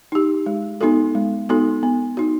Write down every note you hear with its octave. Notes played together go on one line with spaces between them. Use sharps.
D#4 G4
G#3
B3 D#4 F#4 A4
G#3
B3 D#4 F#4 A4
B3
D#4 F#4